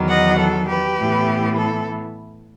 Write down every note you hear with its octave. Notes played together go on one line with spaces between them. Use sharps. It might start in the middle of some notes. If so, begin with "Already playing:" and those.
Already playing: E2 D#3 F#3
D#5 F#5
A4
G4 B4
A2 E3 B3 E4
A4